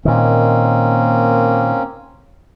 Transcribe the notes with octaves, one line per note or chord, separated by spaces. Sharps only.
A#2 D#3 A#3 C4 C#4